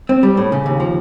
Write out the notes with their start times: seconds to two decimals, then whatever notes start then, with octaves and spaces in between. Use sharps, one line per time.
0.09 C4
0.23 G3
0.37 A2
0.52 C#3
0.66 D#2
0.80 F3